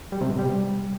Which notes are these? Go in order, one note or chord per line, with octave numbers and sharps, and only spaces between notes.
G3
C3
B2
G3